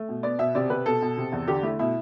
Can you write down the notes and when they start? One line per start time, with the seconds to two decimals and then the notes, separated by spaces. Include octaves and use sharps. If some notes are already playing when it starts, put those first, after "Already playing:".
Already playing: A3
0.09 B2
0.23 B3 D5
0.39 B2 E5
0.55 C3 D5
0.70 C3 B4
0.86 B2 A4
1.02 B2
1.17 C3
1.32 E2
1.48 D3 G4
1.63 A3 E4
1.79 B2 E4